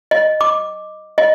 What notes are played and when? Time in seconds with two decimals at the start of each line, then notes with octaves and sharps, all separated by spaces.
0.11 D#5
0.41 D6
1.18 D#5